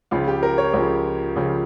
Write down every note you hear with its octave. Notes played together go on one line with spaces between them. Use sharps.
C#2 C#3 F3 F4
G4
A#4
C#5
C#2 C#3 F3 C#5
C#2 C#3 F3